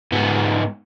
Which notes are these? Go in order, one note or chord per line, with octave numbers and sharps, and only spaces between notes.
G#2 B3